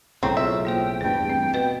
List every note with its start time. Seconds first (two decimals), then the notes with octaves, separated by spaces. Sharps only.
0.23 B1 A2 C#3 C4 A#5 C#6 G6
0.37 F4 E5
0.65 A#3 F4 C5 G5
1.01 E2 G2 A3 G5
1.29 C4
1.54 B2 B4 A6